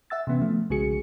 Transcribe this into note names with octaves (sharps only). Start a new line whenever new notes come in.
E5 F#5 E6 A6
C3 E3 B3 C#4
F3 A3
B1 C#3 G#3 F#4 G#4 C#7